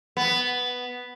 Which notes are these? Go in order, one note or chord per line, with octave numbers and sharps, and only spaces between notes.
B3